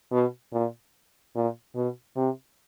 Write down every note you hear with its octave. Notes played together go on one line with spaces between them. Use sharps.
B2
A#2
A#2
B2
C3